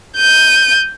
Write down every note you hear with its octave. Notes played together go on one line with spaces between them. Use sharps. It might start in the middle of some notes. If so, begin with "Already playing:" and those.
G6 D#7